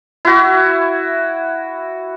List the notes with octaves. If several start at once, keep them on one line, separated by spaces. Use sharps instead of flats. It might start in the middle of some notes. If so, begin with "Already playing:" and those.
E4 F#4